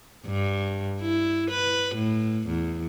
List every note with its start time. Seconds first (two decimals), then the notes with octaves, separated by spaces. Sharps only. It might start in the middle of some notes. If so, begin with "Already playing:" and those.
0.26 G2
1.01 E4
1.51 B4
1.95 A2
2.48 E2